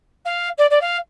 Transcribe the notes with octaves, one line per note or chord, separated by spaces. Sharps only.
F5
D5
D5
F5